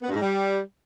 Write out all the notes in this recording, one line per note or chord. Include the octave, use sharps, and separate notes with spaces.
B3
G2
G#2
G3